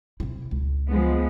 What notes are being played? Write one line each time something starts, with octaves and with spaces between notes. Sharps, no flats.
C3 E4
C#2
F3 G#3 B3